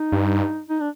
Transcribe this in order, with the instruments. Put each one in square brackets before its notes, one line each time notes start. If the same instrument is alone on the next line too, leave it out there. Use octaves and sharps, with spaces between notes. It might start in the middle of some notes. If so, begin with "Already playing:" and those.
Already playing: [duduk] D#4
[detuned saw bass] G2
[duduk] D#4
D4